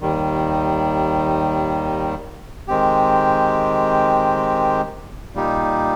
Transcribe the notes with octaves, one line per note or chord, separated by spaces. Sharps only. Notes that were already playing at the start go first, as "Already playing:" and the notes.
D#2 D#3 G3
D#3 G#3 C4 G4
A#2 G3 A#3 D#4 G4